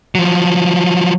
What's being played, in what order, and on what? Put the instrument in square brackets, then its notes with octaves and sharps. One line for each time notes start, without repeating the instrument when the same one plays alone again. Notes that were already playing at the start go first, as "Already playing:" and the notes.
[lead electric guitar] F3 F#3